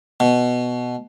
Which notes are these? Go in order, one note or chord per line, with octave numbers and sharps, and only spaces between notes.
B2